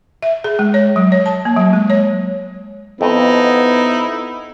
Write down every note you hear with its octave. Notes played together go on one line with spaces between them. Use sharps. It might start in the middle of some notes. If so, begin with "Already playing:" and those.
E5
G#4
G#3
C#5
F#3
C#5
A5
A#3
F#3
G#3
C#5
F2 B3 D#4 E4